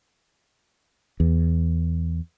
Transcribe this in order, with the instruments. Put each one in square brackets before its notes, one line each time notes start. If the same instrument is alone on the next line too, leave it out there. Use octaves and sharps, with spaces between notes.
[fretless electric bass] E2